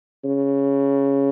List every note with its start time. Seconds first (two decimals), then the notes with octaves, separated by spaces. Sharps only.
0.24 C#3